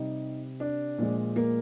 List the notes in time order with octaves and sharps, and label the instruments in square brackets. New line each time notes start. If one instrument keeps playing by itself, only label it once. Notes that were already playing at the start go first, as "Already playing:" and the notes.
Already playing: [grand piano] C3 G3 D#4
D4
A#2 F3 G#3
A#3